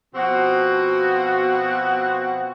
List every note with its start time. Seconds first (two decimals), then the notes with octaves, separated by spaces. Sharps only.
0.15 B2 F3 C4 F#4